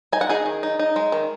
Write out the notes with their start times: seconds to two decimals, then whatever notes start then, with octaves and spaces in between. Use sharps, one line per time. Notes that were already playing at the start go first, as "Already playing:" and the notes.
0.12 D#4 G#5
0.21 F#5
0.29 D#4 G#4 G#5
0.46 D#3
0.63 D#4
0.79 D#4
0.96 G#3
1.12 D#3